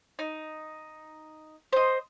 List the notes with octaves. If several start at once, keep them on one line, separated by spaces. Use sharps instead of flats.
D#4
C5 D#5